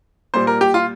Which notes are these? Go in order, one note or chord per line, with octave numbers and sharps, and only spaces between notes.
A#2 G3 C5
A#4
G4
F4